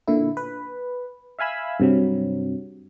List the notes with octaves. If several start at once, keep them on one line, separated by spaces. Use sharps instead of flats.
A#2 D3 E4
B4
E5 F5 G#5 B5 E6
G2 C3 F#3